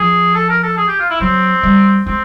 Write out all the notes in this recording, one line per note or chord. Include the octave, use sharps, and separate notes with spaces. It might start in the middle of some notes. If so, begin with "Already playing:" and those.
Already playing: F3 G#4
A4
A#4
A4
G#4
G4
F4
E4
F#3 C4
G3
G#3 C4